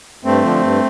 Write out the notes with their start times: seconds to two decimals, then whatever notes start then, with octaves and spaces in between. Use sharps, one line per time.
0.24 G2 A3 C4
0.43 D3 F3
0.62 G2